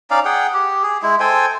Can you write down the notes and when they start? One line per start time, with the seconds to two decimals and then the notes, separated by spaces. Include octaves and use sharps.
0.11 C#4 D#4 D5 F5
0.25 G#4 F#5 G5
0.54 G4
0.83 G#4
1.03 G#3 E4
1.20 A4 C5 G5 G#5